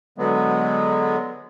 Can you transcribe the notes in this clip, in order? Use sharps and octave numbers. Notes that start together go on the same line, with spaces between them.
D3 F#3 G#3 B3